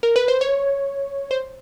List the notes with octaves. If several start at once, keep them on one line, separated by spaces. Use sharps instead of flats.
A#4
B4
C5
C#5
C5